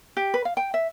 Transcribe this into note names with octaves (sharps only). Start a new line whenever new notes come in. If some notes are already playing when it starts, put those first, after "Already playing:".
G4
B4
F5
G5
E5